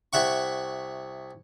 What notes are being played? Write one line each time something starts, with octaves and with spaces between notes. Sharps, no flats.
C2 E5 F#5 C#6